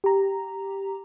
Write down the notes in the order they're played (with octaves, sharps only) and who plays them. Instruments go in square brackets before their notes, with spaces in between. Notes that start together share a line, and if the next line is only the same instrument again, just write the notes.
[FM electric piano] G4 A#5